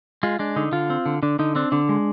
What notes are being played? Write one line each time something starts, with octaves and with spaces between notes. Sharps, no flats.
G#3 F4
G#3 D4
D3 D#4
D3 F4
C4
D3
D3 D4
D3 D#4
C4 D4
D3 D4
G#3